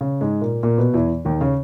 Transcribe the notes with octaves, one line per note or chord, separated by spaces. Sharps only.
C#3
G#2 G#3
A#2 A#3
A#2 A#3
B2 B3
E2 E3
D#2 D#3
C#3